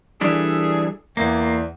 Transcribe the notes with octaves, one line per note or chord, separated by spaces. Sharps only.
E3 G3 D4 G#4 A4
E2 A#3